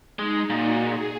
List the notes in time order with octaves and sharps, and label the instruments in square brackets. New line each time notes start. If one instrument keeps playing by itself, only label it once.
[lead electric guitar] G#3 [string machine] D#4
[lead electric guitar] A#2 [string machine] F#4
[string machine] G#4